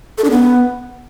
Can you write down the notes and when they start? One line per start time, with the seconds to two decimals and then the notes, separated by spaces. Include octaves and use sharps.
0.18 A4
0.24 D4
0.31 B3